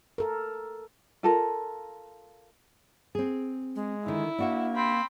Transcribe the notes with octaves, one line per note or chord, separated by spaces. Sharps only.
A4 A#4
F4 A4 A#4
C4 G#4
G#3
D3 D#3 E4
A#3 D4 F#4 E5
C4 B5